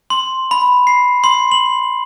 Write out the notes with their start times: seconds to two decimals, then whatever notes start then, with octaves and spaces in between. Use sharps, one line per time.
0.10 C6
0.51 B5
0.87 C7
1.24 C6
1.52 F#7